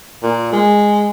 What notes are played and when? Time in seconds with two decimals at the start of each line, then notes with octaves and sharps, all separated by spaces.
0.23 A#2
0.52 G#3